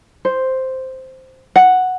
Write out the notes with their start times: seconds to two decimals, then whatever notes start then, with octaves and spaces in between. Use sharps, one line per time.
0.25 C5
1.56 F#5